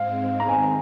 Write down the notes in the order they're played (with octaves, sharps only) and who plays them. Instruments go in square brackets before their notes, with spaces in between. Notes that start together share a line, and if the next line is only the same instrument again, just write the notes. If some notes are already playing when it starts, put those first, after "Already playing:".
Already playing: [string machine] G#2 G#3 C4 [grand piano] F5
[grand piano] A#5
[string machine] D#3 C4 [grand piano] G#5